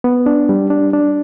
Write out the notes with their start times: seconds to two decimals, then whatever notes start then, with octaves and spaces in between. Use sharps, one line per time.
0.04 B3
0.26 D4
0.49 G3
0.70 D4
0.93 D4